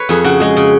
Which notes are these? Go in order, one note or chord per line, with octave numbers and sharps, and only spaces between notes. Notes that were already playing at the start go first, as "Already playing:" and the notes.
Already playing: B4 C#5
F2 G#4
C#3 F#4
G#3 G#4
C#3